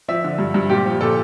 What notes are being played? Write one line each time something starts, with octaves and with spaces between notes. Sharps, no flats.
F3 E5
D3
G2
G2
A#2 G4
F3
A#2 A4